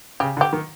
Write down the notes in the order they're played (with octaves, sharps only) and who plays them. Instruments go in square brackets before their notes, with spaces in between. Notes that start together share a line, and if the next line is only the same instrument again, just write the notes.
[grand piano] C#3 [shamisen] G4
[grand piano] D3
[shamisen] G4
[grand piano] D#3